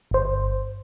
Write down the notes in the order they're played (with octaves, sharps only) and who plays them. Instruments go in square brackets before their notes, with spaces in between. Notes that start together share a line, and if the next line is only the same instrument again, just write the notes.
[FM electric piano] G1 C5